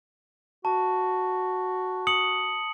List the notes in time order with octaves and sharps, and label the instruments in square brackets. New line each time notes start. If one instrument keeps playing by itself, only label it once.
[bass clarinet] F#4 [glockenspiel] A5
[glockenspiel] D#6 C#7 F#7